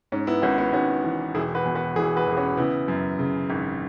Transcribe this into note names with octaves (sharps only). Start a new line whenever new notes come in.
G#2 C#4
B3 E4
G#1 C#4 F#4
B3 E4
G#1 C#4 F#4
E3
E1 E4 G#4
F#4 B4
E2
F#4 B4
E1 E4 G#4
F#4 B4
E1 G#4
C#4 F#4
C#3 B3 E4
F#2
C#3
G#1